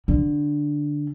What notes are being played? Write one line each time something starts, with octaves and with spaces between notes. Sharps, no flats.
D3